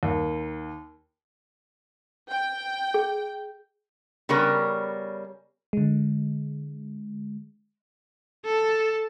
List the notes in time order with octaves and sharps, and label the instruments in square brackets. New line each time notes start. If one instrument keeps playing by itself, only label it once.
[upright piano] D#2
[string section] G5
[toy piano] G#4
[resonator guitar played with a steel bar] C#3 G3 B3 C#4 A#4
[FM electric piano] D3 G#3
[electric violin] A4 A5